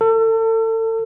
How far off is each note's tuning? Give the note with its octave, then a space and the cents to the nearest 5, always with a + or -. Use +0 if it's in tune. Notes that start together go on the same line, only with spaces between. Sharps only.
A4 +35